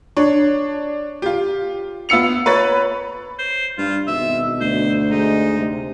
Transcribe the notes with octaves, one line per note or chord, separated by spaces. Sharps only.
D4 C#5
F4 G4
B3 F4 E6 C#7 F7
B4 C#5 B5 A6
C5
G2 F4
G#1 B2 E5
D2 C5
G#3 D#4
C3